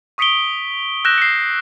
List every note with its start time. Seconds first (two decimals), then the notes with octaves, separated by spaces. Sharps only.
0.18 C#6 D#6 B6 C#7 D7 G7
1.05 E6 F#6 G6 A#6 E7
1.18 C7 C#7